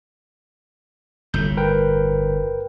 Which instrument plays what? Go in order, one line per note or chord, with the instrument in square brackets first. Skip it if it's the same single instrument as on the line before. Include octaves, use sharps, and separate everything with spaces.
[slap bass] G1 A2 [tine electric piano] G6
[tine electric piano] A#4 B4 G5